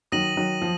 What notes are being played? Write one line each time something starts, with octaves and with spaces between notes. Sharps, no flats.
D#3 F#3 D#6 A#6 D#7 F#7
D#3 F#3
F3